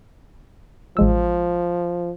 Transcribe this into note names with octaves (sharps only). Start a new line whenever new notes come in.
A1 F3 G#3 E6